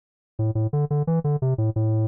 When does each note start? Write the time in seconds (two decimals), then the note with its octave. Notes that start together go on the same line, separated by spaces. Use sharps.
0.39 A2
0.55 A2
0.73 D3
0.90 D3
1.07 E3
1.24 D3
1.42 C3
1.58 A2
1.76 A2